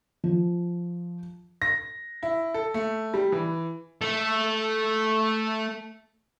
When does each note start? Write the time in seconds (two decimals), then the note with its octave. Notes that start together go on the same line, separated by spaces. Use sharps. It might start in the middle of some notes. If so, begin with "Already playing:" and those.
0.24 F3
1.62 A#6
2.23 E4
2.54 A4
2.74 A3
3.14 G3
3.32 E3
4.01 A3 A4